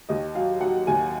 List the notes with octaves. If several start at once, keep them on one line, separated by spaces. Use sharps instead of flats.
D#2 D#5
F#3 F5
F#3 F#5
D#2 G#5